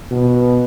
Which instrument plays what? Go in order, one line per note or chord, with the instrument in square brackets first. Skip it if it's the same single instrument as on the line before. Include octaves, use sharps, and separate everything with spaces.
[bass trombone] B2